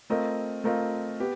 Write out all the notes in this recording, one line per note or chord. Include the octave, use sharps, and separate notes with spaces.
A3 C4 F4 A#4 D#5
A3 C4 F4 A#4 D#5
B3 G4